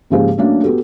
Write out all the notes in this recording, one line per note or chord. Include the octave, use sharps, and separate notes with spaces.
G#2 C#3 F3 A#3 G4 G#4
F#3 A3 A#3 C#4 D4
B3 F#4 G4 A4